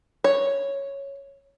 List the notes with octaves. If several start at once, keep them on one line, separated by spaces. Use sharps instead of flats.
C#5